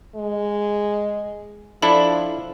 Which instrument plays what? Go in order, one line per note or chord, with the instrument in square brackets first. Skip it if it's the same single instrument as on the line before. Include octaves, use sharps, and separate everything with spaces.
[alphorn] G#3
[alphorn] F3 [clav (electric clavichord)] D4 E4 A4 [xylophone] B5